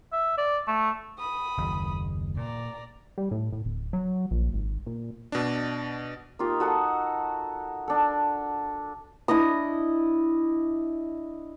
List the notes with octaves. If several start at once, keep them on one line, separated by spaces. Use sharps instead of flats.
E5
D5
A3
B5 D#6
F#1 D#2
A#2 D5 A#5
G3
A2
A2
D1
F#3
A#1
G#1
A#2
B2 D4
A#3 D#4 F4 G4
F#4 A4 D#5 F#5
D4 A4
D4 E4 D#5 D#6